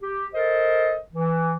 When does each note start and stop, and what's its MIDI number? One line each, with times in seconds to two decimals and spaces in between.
0.02 0.27 67
0.34 0.96 69
0.34 0.96 70
0.34 0.96 72
0.34 0.96 75
1.14 1.54 52